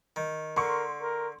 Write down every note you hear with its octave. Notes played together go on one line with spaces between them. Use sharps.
D#3
D3 A#4 C6 C#6
A#4